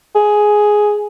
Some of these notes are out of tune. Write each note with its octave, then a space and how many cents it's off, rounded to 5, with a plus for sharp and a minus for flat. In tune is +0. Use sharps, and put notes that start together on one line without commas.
G#4 +5